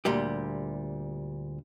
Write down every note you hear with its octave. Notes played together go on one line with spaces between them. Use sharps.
D2 A#2 G3 G4